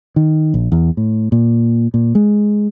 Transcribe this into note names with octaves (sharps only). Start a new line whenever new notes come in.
D#3
A#1
E2
A2
A#2
A#2
G#3